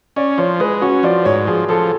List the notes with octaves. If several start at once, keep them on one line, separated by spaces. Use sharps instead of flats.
C#4 D5
F3 C#5
G#3 B4
C#4 F#4
F3 D5
G#2 C#5
F3 G#4
F3 A4